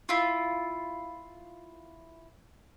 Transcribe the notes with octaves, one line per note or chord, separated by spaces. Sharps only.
E4 F4